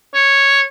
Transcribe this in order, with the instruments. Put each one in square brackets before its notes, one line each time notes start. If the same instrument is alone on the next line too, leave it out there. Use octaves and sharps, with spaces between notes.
[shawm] C#5